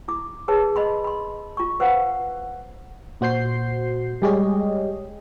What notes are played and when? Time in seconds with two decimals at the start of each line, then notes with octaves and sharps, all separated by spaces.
0.08 E4 D6
0.48 G#4 B4 C#5 A5
0.76 D#5 B5 C6
1.04 B5 C6
1.57 F4 C#6
1.80 B4 C5 F5 F#5
3.21 A#2 F#4 C5 G6 C7
4.22 G3 G#3 G4 G#4 C#5 D#5